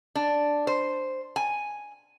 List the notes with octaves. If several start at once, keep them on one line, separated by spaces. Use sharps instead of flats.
D4
C5
G#5